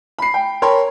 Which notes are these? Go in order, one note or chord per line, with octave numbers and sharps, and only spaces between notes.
B5 C7
G5
A#4 C#5 G5 A5 B5 C6